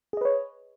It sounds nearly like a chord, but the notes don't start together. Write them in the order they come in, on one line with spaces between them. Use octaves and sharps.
G#4 D#5 B4 C#5